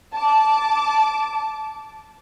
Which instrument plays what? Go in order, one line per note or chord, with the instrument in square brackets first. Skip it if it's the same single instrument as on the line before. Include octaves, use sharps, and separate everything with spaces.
[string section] A5 D6